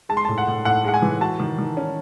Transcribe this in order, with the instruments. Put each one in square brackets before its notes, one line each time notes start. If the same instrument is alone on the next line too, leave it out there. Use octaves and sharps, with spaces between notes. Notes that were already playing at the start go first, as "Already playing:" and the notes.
[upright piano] G#3 [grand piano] A5
[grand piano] C6
[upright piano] A2 [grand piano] A5
[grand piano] F#5
[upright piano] A2
[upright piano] A2 [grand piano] F#5
[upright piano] G#3 [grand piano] F#5
[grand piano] G#5
[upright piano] E3
[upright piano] F#4 [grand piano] A5
[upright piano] D#3
D#3
C#4